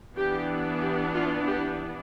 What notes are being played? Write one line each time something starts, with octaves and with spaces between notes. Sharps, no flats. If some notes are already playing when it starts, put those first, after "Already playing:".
E3 B3 D4 G4
G4
F4
G4